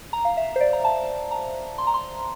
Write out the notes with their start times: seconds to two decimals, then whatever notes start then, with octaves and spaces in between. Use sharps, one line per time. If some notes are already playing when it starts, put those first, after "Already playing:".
0.13 A#5
0.25 F5
0.37 E5
0.56 C5
0.61 D5
0.73 A#5
0.85 A5
1.31 A#5
1.78 C6
1.87 A#5
1.94 C6